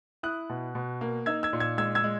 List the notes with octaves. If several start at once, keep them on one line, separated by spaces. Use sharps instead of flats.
E4 D#6 F#6
B2
B2
A#3
D#4 E6 G#6
E6 G#6
A#2
E6 G#6
G#3 E6 G#6
E6 G#6
G#3